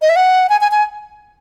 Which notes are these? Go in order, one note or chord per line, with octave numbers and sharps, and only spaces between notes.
D#5
E5
F#5
G#5
G#5
G#5